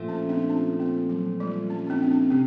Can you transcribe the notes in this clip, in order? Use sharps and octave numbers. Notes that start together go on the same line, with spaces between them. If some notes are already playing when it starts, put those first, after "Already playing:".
Already playing: A#2 F3 A3
C#4
C4 D4
C#4
C4
F#3
G3
C#4
C#4
C4 D4
C4
C#4
C3 C4